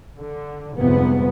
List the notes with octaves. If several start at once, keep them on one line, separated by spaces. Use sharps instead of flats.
D3
G1 F2 G#2 C3 F3 B3